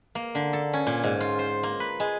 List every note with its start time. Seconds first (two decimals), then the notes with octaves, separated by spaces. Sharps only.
0.15 A#3
0.35 D3
0.53 A4
0.73 C#4
0.87 A#2
1.04 G#2
1.21 F4
1.39 C5
1.63 A#3
1.80 B4
2.00 G#3